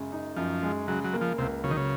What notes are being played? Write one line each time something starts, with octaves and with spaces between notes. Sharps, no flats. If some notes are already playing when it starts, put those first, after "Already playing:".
Already playing: F#2 C#3 G#3
D#4
F#2 F3
G#3
C#3 F#3
F#3
A#3
F3
C#2 C3
C#3 F#3
D#3
C#3